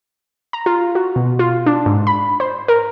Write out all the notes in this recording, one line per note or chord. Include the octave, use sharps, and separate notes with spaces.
A#5
F4
F#4
B2
F4
D4
G#2
B5
C5
A#4